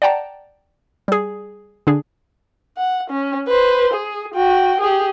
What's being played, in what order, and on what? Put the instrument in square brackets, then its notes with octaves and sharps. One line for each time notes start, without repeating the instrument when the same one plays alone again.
[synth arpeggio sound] D5 F#5 G5 A5 A#5
G3 G#4
D3 D4 G#4
[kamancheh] F#5
C#4
B4 C5
G#4
F#4 G5
G4 G#4